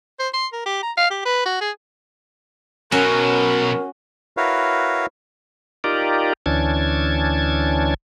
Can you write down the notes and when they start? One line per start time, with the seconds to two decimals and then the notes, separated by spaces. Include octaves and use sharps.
0.19 C5
0.34 C6
0.53 A#4
0.65 G4
0.83 A#5
0.97 F5
1.11 G4
1.25 B4
1.46 F#4
1.61 G#4
2.92 B2 F#3 C#4 F#4 A#4
4.37 E4 F#4 A#4 B4 C#5 F5
5.84 D#4 F4 G4 A#4 D5
6.46 D2 E3 C#4 D4 A5 G#6